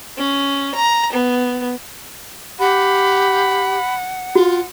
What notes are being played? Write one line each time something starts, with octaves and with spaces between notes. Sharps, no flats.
C#4
A#5
B3
G4 F#5 B5
F4 F#4